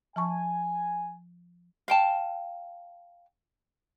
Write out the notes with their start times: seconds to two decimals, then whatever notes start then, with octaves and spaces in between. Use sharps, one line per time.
0.16 F3 G#5 A5 C#6
1.88 F5 G5 A5